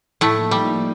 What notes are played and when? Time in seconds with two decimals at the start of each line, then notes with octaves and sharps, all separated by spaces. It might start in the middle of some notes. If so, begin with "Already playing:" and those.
0.21 A2 F3 A3 A#3 D#4
0.51 G3